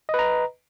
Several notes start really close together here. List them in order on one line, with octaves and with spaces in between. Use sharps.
D#5 B4 A#5